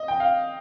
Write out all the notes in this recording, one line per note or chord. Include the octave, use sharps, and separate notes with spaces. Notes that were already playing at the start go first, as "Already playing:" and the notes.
Already playing: D#5
G5
F5